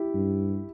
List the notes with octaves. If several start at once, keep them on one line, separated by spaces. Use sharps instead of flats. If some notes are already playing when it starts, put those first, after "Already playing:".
Already playing: E4 G4
G2